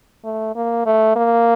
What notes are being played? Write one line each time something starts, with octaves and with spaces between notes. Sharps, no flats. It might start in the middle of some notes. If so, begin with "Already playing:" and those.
A3
A#3
A3
A#3